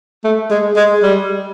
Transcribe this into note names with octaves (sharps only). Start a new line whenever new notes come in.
A3
G#3
G#3
G3